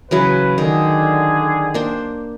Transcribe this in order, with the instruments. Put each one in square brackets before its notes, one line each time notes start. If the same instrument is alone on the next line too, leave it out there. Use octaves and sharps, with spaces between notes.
[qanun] C#3 E3 F#3 [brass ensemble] B4
[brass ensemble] D3 G#4 [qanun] D#3
[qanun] A#3 D4 C5